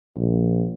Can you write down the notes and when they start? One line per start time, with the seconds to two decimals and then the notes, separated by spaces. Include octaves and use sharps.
0.17 A#1